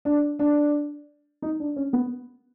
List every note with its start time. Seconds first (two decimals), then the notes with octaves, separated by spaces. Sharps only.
0.05 D4
0.39 D4
1.42 D#4
1.60 D4
1.76 C#4
1.93 B3